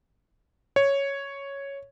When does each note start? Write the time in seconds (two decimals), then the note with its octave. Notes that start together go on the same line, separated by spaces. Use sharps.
0.76 C#5